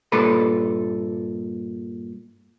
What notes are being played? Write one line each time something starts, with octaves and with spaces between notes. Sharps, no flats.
G2 A#2 A4 B4